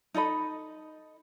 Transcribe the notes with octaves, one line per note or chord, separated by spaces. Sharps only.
D#4 A4 D#5 B5